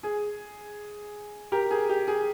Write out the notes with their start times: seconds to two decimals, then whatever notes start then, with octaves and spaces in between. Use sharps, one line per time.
0.03 G#4
1.52 G4 A#4
1.71 G#4
1.89 G4
2.08 G#4